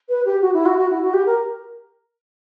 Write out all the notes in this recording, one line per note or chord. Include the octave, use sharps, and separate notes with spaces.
B4
G4
F#4
E4
F#4
F#4
E4
F#4
G4
A#4